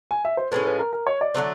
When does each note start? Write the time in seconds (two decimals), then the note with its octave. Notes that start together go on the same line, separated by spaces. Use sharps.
0.11 G#5
0.25 E5
0.37 C5
0.52 A2 F3 G#3 C#4 B4
0.65 B4
0.79 A#4
0.93 A#4
1.07 C#5
1.21 D5
1.34 D3 F#3 A3 C4